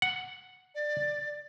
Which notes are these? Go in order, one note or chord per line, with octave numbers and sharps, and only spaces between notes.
F#5
D5